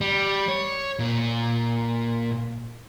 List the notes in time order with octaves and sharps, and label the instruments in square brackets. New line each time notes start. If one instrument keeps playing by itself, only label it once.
[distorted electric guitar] G3
C#5
A#2